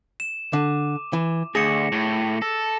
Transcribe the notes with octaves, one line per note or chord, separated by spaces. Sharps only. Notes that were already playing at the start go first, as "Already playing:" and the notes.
E7
D3 D6 D#7
E3
D2 G#4 A#6 C#7 E7
A2 A#6
A4 A#6